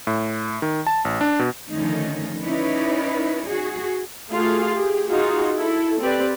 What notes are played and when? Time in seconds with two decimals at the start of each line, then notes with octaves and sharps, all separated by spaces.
0.07 A2
0.62 D#3
0.87 A5
1.05 A1
1.21 D4
1.39 B2
1.71 D3 D#3 F3 A3 C#4 D#4
2.41 C#4 D#4 E4 B4 C#5 D5
3.46 F#4 G#4
4.32 A3 F4 F#4 G#4 F5
4.75 G4 G#4
5.09 D#4 F4 F#4 G#4
5.58 E4 A4
6.01 C4 G4 B4 D5